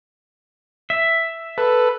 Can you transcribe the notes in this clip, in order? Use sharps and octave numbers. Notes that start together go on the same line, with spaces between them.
E5
A4 B4